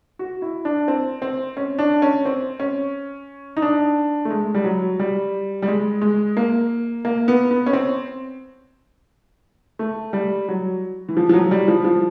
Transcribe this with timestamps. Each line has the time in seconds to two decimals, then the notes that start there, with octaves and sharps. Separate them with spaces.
0.19 F#4
0.42 E4
0.65 D4
0.88 C4
1.22 C4
1.57 C#4
1.79 D4
2.02 C#4
2.25 C4
2.60 C#4
3.57 D#4
3.62 D4
4.25 A3
4.30 G#3
4.55 G3
4.64 F#3
4.99 G3
5.62 G3
5.68 G#3
6.01 G#3
6.37 A#3
7.05 A#3
7.28 B3
7.51 B3
7.66 C#4
7.73 C4
9.79 A3
10.13 G3
10.49 F#3
11.09 E3
11.17 F3
11.29 F3
11.34 F#3
11.51 G3
11.68 F3
11.85 F3